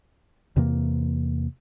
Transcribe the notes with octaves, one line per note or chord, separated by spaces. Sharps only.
E2 C3 E3 A#3